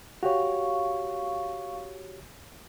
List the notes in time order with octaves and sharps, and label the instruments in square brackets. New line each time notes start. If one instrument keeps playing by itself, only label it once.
[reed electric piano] F#4 G4 C#5 [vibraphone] F5 C#6